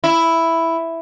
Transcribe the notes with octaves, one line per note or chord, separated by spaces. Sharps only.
E4